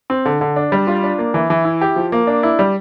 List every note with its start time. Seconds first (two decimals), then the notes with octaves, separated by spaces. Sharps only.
0.10 C4
0.25 D3
0.41 D3
0.56 D4
0.72 G3
0.87 F4
1.03 D4
1.19 A#3
1.34 E3
1.50 E3
1.65 E4
1.81 G4
1.96 F3
2.12 A#3
2.27 D4
2.43 E4
2.59 G3